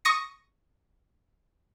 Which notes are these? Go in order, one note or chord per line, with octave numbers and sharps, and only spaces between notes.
C#6 D#6 A#6 C#7